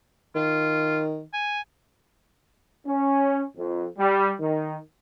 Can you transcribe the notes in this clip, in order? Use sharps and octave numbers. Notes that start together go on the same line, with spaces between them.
D#3 F4
G#5
C#4
F2
G3
D#3